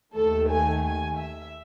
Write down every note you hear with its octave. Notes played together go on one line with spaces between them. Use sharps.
D#2 D#3 A3 A4
G#5
G#5
E5